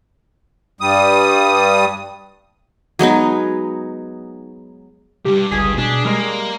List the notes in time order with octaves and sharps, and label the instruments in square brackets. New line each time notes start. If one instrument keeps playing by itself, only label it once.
[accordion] G2 G3 D#6
[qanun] F#3 G#3 B3 D#4
[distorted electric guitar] C2 G2 [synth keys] G4
[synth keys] G1 C#2 B6 [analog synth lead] G#4
[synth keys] B2 B6 [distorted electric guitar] D4
[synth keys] G3 G#3 [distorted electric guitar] A#3